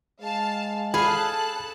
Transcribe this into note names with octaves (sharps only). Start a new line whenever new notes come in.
G#3 F5 A5
G#4 A4 F5 A5 B5 F#6